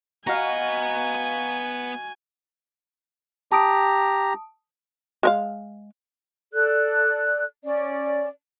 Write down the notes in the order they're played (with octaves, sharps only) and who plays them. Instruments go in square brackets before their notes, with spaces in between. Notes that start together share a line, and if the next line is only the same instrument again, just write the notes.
[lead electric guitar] B3 F#5 [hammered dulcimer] F#4 D#5 [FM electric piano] F5 A#5 [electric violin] G#5
[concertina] G4 A#5 [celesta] A5 D#6 D7
[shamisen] G#3 A#4 F5
[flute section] A4 D5 F#6
C#4 D5